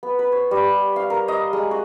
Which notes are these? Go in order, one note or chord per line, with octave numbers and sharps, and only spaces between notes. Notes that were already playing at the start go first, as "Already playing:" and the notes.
B3
B4
C#5
G3
F5
A#4
D#5
G#3
F#4